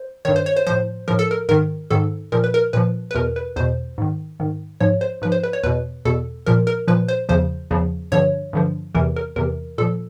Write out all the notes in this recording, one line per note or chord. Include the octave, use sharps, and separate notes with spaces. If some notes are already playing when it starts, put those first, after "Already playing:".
Already playing: C5
G2 D#3 C#5
C5
C#5
C5
A2 F3 C5
A2 F3 A#4
A4
A#4
G#2 D#3 A#4
G#2 D#3 A4
A#2 F3 A#4
B4
A#4
A#2 F3 B4
B4
E2 B2 A#4
B4
E2 B2 C5
G#2 D#3
G#2 D#3
G#2 F3 C#5
C5
G#2 F3 B4
C5
B4
C#5
E2 B2 B4
E2 B2 A4
A#2 F3 A#4
A#4
A#2 F3 B4
C5
E2 C#3 F3 C5
E2 C#3 F3
G2 D3 F3 C#5
G2 D3 F3
E2 C3 E3 A#4
A#4
E2 C3 E3 A#4
A#2 F3 A4